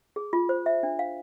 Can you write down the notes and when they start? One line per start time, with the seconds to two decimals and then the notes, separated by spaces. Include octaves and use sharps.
0.16 G#4
0.33 F4
0.49 C5
0.66 E5
0.83 D4
0.99 F5